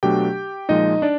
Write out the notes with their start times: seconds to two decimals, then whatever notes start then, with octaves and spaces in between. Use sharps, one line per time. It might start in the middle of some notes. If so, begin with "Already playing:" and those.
0.03 B2 F#3 A3 D4 G4 G5
0.69 A#2 F3 G#3 D#4 D#5
1.02 D4 D5